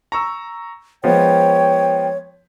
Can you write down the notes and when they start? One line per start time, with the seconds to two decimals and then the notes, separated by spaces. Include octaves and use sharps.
0.12 A#5 C#6 E6
1.04 F3 G#3 B3 C#5 G5